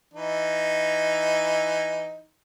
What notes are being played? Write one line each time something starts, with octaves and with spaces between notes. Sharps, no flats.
E3 D#4